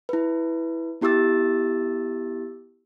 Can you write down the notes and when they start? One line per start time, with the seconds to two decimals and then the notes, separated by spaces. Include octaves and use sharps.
0.09 E4 B4
1.01 B3 E4 G4 D6 E6 A6